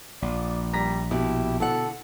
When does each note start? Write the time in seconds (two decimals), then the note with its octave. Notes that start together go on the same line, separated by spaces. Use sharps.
0.22 A#1 D5
0.73 G3 A#5 A#6 B6
1.11 B2 E4 G4
1.60 D3 A4 F#5